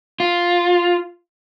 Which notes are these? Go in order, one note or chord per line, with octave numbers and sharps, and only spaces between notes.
F4